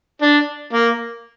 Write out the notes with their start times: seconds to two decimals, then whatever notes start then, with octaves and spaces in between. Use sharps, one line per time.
0.22 D4
0.73 A#3